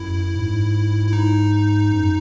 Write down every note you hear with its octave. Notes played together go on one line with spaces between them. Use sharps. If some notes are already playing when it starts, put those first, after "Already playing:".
Already playing: F#2 E4
G#2
E4
D#4
F#2